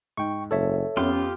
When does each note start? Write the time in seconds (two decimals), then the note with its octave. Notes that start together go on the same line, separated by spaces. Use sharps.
0.17 G#2 G5 C#6
0.51 F#1 A4 C#5 E5
0.97 F2 B3 C#4 F4 G4 C6